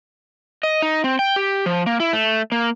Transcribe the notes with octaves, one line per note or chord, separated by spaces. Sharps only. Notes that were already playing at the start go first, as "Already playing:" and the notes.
D#5
D#4
C4
G5
G4
F3
A#3
E4
A3
A#3